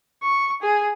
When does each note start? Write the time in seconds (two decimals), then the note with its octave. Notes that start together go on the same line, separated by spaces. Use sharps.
0.23 C#6
0.62 G#4